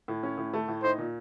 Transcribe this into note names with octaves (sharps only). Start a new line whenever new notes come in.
A2
C#4
A2
A3
A2
D#4 C5
A#2